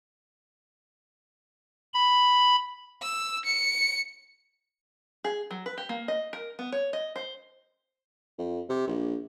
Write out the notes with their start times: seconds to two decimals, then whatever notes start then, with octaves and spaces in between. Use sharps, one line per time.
1.94 B5
3.02 E6
3.45 C#7
5.24 G#4
5.51 F#3
5.66 B4
5.78 G4
5.89 A#3
6.08 D#5
6.33 A#4
6.59 B3
6.72 C#5
6.93 D#5
7.16 C5
8.39 F2
8.69 C3
8.87 A#1